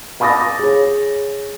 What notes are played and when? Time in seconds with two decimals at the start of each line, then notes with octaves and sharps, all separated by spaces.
0.20 F5 B5 D6 D#6 A6 A#6
0.59 G#4 C#5